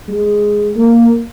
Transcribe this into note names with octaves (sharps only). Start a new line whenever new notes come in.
G#3
A#3